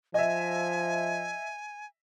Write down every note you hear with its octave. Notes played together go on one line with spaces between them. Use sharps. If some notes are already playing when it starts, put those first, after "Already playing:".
F3 D#5 E5 G#5